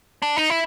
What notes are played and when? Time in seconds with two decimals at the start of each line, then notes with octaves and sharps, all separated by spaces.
0.22 D4
0.37 D#4
0.50 E4